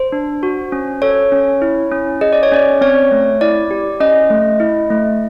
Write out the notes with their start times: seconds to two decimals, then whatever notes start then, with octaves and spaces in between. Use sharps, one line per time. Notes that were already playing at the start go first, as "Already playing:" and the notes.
Already playing: C5
0.12 D4
0.43 F#4
0.72 C#4
1.02 A4 C#5
1.32 C#4
1.62 E4
1.92 C#4
2.21 G#4 D#5
2.33 D5
2.43 C#5
2.52 C#4 D5
2.81 C4 C#5
3.11 A3
3.41 E4 D5
3.71 G4
4.00 C#4 D#5
4.30 A3
4.60 E4
4.90 A3